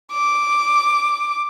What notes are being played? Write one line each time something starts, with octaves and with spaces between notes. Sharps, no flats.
D6